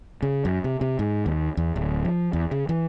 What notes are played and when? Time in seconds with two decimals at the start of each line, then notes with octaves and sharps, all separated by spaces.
0.23 C#3
0.45 F#2
0.64 C3
0.81 C3
0.99 G#2
1.26 D#2
1.57 E2
1.76 D1
2.05 F3
2.33 E2
2.51 C#3
2.69 E3